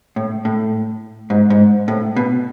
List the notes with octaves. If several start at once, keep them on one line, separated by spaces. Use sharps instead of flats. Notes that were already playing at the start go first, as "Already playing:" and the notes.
A2
A2
G#2
G#2
A2
B2